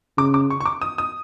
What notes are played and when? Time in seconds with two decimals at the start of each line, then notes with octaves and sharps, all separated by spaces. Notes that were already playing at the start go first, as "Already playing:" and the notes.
0.18 C#3 D6
0.34 D6
0.50 C#6
0.60 C#6
0.66 D6
0.82 D#6
0.98 D#6